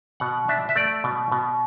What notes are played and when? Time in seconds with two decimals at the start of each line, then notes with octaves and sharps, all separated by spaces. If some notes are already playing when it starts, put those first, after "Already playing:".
0.20 B2 F#5
0.48 D4 E5
0.69 E5
0.76 A3 D5
1.04 B2
1.32 B2